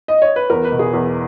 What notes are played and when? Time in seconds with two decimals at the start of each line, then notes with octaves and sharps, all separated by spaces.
0.08 D#5
0.22 C#5
0.36 B4
0.50 E2 A#4
0.65 B4
0.72 B2
0.79 G#4
0.93 E2